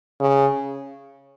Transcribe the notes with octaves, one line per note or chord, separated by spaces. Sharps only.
C#3